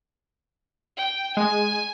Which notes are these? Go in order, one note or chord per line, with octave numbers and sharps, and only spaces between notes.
G5
G#3 G#5